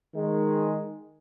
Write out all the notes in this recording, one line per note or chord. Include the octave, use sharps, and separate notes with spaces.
D#3 G#3